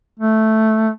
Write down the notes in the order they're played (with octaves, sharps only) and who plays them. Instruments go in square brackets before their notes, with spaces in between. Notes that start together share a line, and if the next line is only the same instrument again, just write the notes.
[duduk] A3